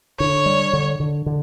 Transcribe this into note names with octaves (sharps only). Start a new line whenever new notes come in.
D3 C#5
G3
D3
D3
D3